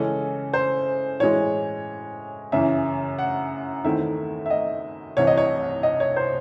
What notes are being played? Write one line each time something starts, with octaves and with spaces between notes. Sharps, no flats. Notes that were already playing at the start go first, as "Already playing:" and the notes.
Already playing: C#3 E3 G#3 C#4 A4
C5
A2 E3 G#3 C#5
F#2 C#3 E3 E5
F#5
E2 D#3 A3 C4 E4 E5
E5
D#5
C2 C3 E3 C#5
D#5
C#5
D#5
C#5
C5